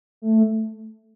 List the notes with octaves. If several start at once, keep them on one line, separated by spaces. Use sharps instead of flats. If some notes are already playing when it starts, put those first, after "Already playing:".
A3